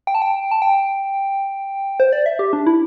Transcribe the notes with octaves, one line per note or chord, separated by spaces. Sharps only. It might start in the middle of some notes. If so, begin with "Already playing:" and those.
G5
A5
G5
A5
G5
C5
D5
E5
G4
D4
E4